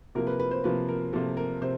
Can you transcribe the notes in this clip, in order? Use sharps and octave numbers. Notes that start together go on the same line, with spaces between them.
C3 F3 A#3 A#4
B4
B4
C5
C3 F3 A#3 B4
A#4
C3 F3 A#3 A4
A#4
C3 C5